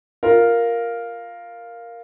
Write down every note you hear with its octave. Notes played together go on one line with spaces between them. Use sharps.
F4 A#4